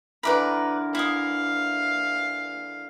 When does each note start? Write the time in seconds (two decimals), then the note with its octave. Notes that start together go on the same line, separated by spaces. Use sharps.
0.23 D3 E3 A#4 B4 D5 B5
0.95 E4 F5 D#6